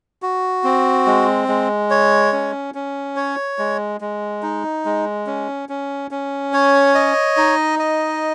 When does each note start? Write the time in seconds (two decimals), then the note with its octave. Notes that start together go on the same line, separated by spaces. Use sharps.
0.22 F#4
0.64 C4
1.06 G#3
1.48 G#3
1.90 C#5
2.32 C#4
2.75 C#4
3.16 C#5
3.58 G#3
4.01 G#3
4.42 D#4
4.85 G#3
5.26 C#4
5.69 C#4
6.11 C#4
6.53 C#5
6.95 D#5
7.37 D#4
7.79 D#5